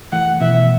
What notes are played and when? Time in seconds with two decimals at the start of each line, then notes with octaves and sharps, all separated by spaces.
0.12 E3 A3 F#5
0.41 B2 E3 E5